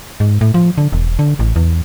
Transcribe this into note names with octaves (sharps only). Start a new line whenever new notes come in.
G#2
A2
F3
D3
E1
D3
A1
E2